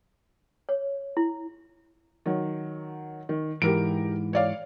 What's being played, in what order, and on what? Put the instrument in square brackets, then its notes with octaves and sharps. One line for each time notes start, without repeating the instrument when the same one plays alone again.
[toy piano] C#5
E4
[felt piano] D#3 F#3
D#3
[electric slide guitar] G#2 E3 [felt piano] G4 A#4 D7
[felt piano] C#5 D5 F5